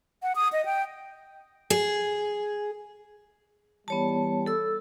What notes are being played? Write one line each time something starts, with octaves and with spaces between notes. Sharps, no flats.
F#5
D#6
D#5
G5
G#4
E3 G3 B3 C#5 A5
A4 E6